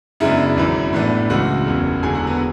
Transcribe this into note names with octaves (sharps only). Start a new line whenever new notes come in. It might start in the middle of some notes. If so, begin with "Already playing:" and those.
F#2 C#3 G#3 B3 D4 E4 E5
G#1 F#2 E3
A2 E3 B3 D4
C#2 C#3 E3 G#3 F#4 F#5
F#1 E2 C#3
E1 E2 D3 F#3 G#4 G#5
F#4 F#5
B3 B4